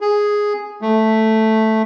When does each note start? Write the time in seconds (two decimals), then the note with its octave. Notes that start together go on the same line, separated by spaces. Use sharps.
0.01 G#4
0.81 A3